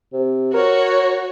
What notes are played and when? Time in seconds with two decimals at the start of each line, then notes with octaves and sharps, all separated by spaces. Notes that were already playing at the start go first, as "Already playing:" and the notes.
0.13 C3
0.54 F#4 A#4 C#5